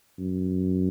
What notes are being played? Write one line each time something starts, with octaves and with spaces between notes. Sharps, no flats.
F#2